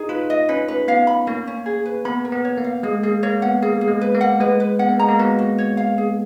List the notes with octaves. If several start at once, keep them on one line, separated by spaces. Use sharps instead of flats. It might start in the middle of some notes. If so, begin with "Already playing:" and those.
Already playing: D#4 G#4
F4 B4
D#5
C#4 B4
B4
B3 F5
B5
A#3 C#4
C#4
G#4
B4
B3 B5
A#4
B3
C#5
A#3
F5
G#3 G#4
A#3 G#4
A#3 C#5
B3 F#5
A#3 G#4
G#4
G#3
B4
A#3
F#5
G#3 B4
B4
B3 F#5
A#3
G#3 A#5
A#3
B3 F#4
F#4
C#5
F5
G#4